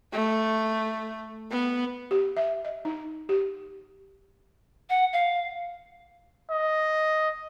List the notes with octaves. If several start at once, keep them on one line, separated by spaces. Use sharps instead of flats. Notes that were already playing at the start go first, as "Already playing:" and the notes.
A3
B3
G4
E5
D#5
D#4
G4
F#5
F5
D#5